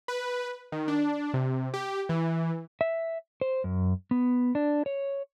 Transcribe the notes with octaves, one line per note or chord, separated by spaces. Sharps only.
B4
D#3
D4
C3
G4
E3
E5
C5
F#2
B3
D4
C#5